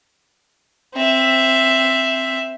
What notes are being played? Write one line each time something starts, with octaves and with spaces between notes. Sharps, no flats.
C4 E5